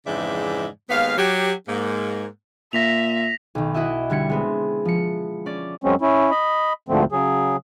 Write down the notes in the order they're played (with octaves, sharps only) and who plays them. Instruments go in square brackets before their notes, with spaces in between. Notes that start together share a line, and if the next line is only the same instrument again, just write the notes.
[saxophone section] F2 G#2 C#3 E3 D5 E5
D#2 G#3 B3 F5
F#3 G4
G#2 A#3
[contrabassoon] A#2 [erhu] E5 [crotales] A#6 B6 F7
[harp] B1 D#3
E4 F#4 D#5 E5
D3 G3 G#6 C#7
G#3 B3 C4
F3 C#7
C#4 D5 A6
[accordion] F#2 F#3 G#3 C4 C#4
C#4 E4
D#5 B5
D2 G#2 D3 F3 A3 C4
C#3 F#3 G#4